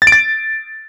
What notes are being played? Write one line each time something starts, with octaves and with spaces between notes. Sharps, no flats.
A6
D7
A6